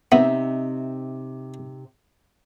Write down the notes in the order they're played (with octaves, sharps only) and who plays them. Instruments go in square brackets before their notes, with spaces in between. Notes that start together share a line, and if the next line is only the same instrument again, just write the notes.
[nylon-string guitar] C3 C4 D#4 [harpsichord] B3 [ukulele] E5